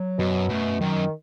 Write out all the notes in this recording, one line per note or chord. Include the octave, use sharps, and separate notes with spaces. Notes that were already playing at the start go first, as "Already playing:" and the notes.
Already playing: F#3
F#2 B2
F#2 A3
F#2 D#3